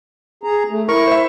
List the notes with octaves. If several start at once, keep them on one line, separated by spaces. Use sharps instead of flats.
G#4 A#5
A3
E4 A#4 C#6
C5 E5